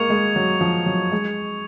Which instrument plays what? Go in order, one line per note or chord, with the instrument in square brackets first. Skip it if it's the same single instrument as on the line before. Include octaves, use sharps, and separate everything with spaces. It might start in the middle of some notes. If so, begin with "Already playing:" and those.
Already playing: [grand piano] G#3 A#3 [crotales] C#6 G#6 C#7 F7
[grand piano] G#3
F#3
F3
F#3
G#3